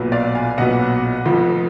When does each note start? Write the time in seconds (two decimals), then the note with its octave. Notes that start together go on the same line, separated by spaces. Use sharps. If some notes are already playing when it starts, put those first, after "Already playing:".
Already playing: B1 A#2 F#3 B3
0.12 D5 F5
0.35 F5 G#5
0.58 B1 A#2 F#3 B3 D#5 F#5
1.25 F1 F2 F3